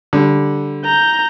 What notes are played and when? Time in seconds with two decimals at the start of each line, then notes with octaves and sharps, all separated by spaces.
0.13 D3 G3
0.86 A#5 G6